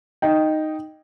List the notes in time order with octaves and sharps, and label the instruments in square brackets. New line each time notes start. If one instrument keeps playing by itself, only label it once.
[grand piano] D#4 G5